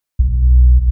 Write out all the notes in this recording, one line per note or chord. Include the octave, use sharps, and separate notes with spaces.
B1